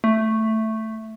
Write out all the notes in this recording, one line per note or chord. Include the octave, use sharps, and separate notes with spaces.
A3